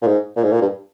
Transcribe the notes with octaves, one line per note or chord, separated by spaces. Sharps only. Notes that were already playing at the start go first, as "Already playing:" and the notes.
A#2
G#2
A#2
G#2
A#2
G2